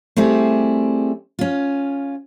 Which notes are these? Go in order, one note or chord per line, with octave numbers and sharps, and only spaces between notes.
G3 A3 C4 E4 G#4
C#4 F4